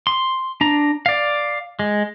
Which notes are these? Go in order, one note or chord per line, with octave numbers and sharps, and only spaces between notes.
C6
D4 A#5
D5 F5
G#3